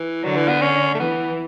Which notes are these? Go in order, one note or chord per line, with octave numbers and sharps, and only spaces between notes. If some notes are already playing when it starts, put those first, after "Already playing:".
Already playing: E3
D3 F#3
E3
B3
C#4
A3
E3 B3